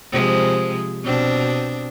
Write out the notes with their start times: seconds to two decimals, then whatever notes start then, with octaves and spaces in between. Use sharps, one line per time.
0.11 C3 F3 G#3
1.03 B2 C4 D4